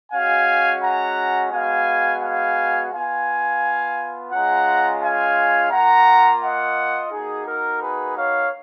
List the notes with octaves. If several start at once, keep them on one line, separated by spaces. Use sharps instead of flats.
G#3 C#4 F#4 F5 G#5
F#5 A#5
G#3 B3 F#4 F5 G#5
F5 G#5
B3 F4 F5 G#5
G#3 C#4 F4 F#5 A#5
F5 G#5
A#3 F4 F#5 A#5
D#5 F#5
A#3 D#4 F#4 G#4
A#4
G#4 B4
C#5 F5